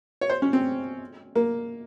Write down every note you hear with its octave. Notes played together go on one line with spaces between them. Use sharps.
C#5
C5
C#4
C4
A#3